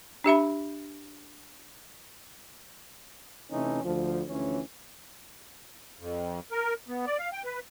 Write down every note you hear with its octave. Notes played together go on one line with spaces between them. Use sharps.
D4 G4 E5 B5
C3 E3 A3 C#4 D#4
D2 F3
D2 E3 F3 C#4
F2
A#4
B3
D5
F5
G5
B4